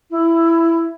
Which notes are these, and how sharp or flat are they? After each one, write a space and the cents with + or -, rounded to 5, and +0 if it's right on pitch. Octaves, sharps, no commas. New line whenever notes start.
E4 +10